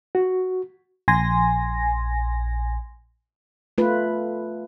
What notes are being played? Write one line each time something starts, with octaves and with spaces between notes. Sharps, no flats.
F#4
A#1 G#5 C6 A#6
A3 F4 B4